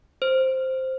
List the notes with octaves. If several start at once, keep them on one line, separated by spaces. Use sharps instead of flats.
C5